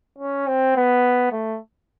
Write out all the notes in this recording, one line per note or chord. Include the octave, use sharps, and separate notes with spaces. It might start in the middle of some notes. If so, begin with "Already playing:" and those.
C#4
C4
B3
A3